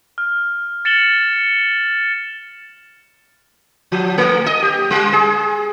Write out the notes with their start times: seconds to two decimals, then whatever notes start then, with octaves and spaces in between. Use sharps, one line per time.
0.18 F6
0.85 A6 C#7 E7 F#7 G7
3.92 F3
4.18 A3
4.46 D#5
4.62 G4
4.90 G3
5.13 G#4